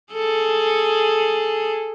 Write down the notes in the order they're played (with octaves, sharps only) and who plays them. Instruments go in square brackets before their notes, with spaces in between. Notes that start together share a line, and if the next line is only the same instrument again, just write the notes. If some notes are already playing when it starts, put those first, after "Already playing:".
[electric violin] G#4 A4